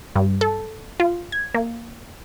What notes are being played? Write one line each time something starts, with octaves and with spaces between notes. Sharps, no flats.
G2
A4
F4
G#6
A#3